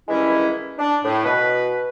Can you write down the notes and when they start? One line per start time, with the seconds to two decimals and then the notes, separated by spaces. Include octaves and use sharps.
0.08 G2 D#3 E3 G#3 C#4 E4
0.79 D4
1.04 A2
1.25 B2 B4